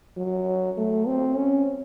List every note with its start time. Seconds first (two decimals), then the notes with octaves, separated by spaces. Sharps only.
0.17 F#3
0.77 A3
1.07 C4
1.36 C#4